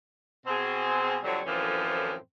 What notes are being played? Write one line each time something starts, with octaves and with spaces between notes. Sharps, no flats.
B2 C4 G#4
F2 D3 F#3 G3 C4 C#5
F#2 A2 D3 E3 F3 C4